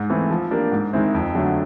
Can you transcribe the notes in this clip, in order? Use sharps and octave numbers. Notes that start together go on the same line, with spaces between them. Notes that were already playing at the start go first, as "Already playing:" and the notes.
Already playing: G#2
E3 A3 C4
F3
A#3 D4 G4
G#2
D#3 G#3 C4 E4
F2
D3 F#3 A3